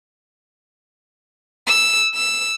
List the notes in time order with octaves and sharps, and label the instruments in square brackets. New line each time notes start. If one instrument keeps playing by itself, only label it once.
[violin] E6
E6